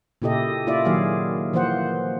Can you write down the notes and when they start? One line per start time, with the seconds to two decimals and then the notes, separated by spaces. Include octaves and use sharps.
0.22 A#2 C#3 E4 G4 A4 D#5
0.67 A#3 E4 F4 D5 E5
0.85 D#3 F#3 A#3 G#4 F5
1.53 E3 F3 A#3 C5 F#5